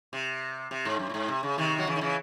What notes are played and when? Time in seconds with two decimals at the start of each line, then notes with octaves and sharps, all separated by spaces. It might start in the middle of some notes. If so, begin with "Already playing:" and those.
0.13 C3
0.71 C3
0.85 G#2
0.99 F#2
1.09 A2
1.14 G#2
1.28 C3
1.43 C#3
1.58 C3 D#3
1.78 F#3
1.87 C#3 E3
1.96 D#3
2.01 C#3 E3